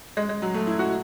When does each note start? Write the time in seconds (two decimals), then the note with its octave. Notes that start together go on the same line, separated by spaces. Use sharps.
0.17 G#3
0.29 G#3
0.42 F#3
0.54 A3
0.67 E4
0.79 F#4